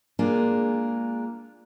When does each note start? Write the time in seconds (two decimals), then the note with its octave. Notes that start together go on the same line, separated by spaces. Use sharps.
0.19 G#3 A#3 D4 F4 G#4